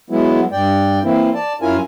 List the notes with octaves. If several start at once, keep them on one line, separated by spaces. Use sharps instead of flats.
F#3 G#3 B3 E4
G2 D5 G5
E3 A#3 C4 E4
D5 A5
F#2 C#4 E4 F4 A#4 G#5